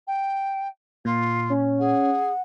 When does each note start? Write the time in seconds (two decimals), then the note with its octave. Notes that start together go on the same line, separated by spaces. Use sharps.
0.07 G5
1.05 A#2 F4
1.50 C#4
1.80 G#4 F#5